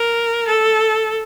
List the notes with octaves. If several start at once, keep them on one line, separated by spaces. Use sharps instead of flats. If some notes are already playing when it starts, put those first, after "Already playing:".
Already playing: A#4
A4